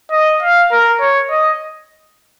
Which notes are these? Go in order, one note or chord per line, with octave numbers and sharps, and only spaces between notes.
D#5
F5
A#4
C#5
D#5